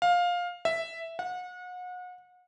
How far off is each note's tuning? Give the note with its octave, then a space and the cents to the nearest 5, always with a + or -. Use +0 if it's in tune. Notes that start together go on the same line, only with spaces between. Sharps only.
F5 +15
E5 +0
F#5 -35